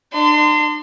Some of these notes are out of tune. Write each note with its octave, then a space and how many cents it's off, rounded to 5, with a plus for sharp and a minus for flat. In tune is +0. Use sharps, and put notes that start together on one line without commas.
D4 +40 C6 -25